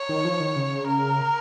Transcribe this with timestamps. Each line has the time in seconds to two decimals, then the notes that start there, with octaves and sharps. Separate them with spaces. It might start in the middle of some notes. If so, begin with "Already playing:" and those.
Already playing: C#5
0.09 D#3
0.25 F3
0.40 D#3
0.56 C#3
0.87 A#4